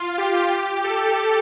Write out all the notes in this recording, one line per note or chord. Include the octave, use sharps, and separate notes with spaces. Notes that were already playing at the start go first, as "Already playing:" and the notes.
Already playing: F4
G4
A4